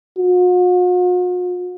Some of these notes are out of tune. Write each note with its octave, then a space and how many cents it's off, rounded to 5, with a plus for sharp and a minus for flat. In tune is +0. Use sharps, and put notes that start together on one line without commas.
F#4 -45